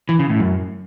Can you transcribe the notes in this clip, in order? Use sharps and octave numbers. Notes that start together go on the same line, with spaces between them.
E3
C#3
A2
F#2